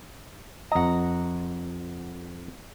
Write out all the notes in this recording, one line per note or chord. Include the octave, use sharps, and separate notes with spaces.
F2 D#5 F#5 A#5